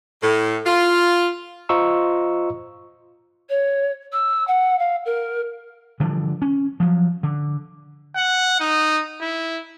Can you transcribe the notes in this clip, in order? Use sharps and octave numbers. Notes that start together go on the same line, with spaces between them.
A2
F4
F4 C5 D#5 A#5 C#6 E6
C#5
E6
F#5
F5
A#4
D3 E3 F3 G3
C#4
F3 F#3
D3
F#5
D#4
E4